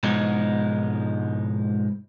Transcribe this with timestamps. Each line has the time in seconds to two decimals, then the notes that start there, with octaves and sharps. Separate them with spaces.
0.03 G#2 B2 F3 G#3 D#4